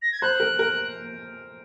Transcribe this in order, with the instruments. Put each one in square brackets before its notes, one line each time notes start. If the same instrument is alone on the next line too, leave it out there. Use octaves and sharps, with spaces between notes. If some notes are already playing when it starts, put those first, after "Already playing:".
[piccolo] A#6
G#6
[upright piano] C5 [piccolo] F#6
[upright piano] A#4
A#4